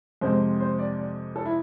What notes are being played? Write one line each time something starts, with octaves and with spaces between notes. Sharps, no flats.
F2 C3 G#3 C4 C5
C5
D5
D5
A4
E4